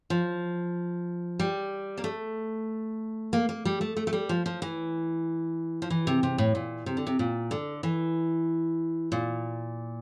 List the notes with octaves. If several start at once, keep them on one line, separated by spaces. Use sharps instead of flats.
F3
G3
A#3
A3
A#3
A#3
G3
A3
A3
A3
G3
F3
F3
E3
F3
E3
C3
C3
A2
A#2
C3
D3
C3
A#2
D3
E3
A#2